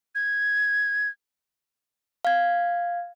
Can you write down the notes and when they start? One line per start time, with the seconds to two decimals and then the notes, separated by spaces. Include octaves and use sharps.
0.15 G#6
2.25 F5 G#6